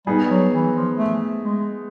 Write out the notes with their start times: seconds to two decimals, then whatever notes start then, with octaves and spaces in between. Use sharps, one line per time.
0.07 G3 B3 D#4 G#4
0.29 F#3
0.53 E3
0.75 F3
0.98 A3
1.43 G#3